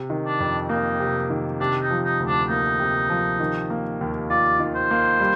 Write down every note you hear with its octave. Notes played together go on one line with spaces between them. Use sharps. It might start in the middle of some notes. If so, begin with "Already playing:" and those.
Already playing: C3
D#3
D4
F2
A#3 D#4
C3
D#3
C3 D4
D#4
F3
D#4
D2
D4
A#3 D#4
C3
F3
D#3
A#3
D#2
F4 D5
D#3
C5
A#3
G3